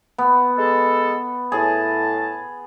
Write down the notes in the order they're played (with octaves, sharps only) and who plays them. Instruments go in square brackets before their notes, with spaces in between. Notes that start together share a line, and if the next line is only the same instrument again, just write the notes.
[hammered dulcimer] B3
[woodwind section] G#3 A4
[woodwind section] A2 A5 [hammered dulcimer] G#4